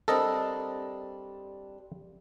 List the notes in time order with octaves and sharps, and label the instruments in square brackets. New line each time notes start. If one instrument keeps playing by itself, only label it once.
[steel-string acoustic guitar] G3 C4 D4 [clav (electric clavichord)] A4 A#4 D#5